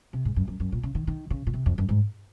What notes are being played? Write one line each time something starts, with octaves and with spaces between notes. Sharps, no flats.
C3
G#2
F#2
F#2
F#2
A#2
C#3
D#3
D#3
C#3
A#2
C3
F2
F#2
G#2